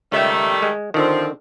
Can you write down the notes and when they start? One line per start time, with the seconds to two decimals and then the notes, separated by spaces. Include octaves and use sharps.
0.12 C#2 D#3 G3 A3 E5
0.62 G#3
0.94 D3 D#3 F3 C4